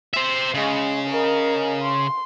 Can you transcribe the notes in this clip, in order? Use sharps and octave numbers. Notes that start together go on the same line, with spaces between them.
C5 E5
C#3 G#3
A#4 D#5
C6